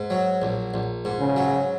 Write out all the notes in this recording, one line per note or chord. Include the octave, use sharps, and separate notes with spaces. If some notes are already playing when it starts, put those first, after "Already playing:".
Already playing: G#2
F#3
A#1
A#1
G#2
C#3
F#3